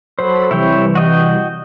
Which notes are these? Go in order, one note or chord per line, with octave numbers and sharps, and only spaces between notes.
F#3 A4 C5 B5
C3 E3 G3 E4 C#5 G5
F#4 D#5 G5